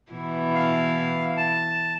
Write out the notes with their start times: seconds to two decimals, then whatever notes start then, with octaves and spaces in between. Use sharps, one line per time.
0.12 B2 E3 E4
0.55 F5
1.37 A5